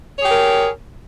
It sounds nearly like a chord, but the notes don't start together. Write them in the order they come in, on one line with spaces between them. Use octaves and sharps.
C#5 G#4 G4 A#4